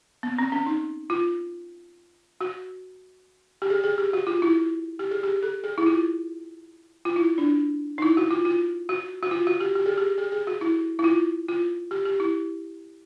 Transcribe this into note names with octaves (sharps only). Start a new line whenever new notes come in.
B3
C4
C#4
D#4
F4
F#4
G4
G#4
G#4
G4
F#4
F4
E4
G4
G#4
G4
A4
G#4
E4
F4
F4
E4
D4
D#4
E4
F#4
F4
F4
F#4
F#4
F4
F#4
G4
G4
G#4
G4
G#4
G#4
F#4
E4
E4
F4
F4
G4
G4
E4